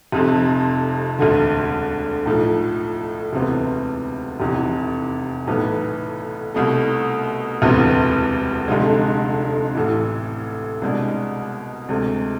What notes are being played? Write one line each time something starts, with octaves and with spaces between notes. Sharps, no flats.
F1 F2 C3
E1 D2 D3
B1 A2 F3
E1 D2 C3 E3 B3
F1 E2 C3 E3
B1 A2 E3 B3
C2 B2 A3
E1 D2 C3 E3 B3
F1 F2 D3 G#3
A1 A2 E3
C2 B2 G#3 D4
D2 C3 G#3